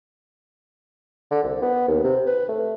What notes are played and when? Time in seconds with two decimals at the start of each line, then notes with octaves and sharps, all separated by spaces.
1.31 D3
1.44 C2
1.62 B3
1.88 D#2
2.04 C3
2.27 B4
2.49 A3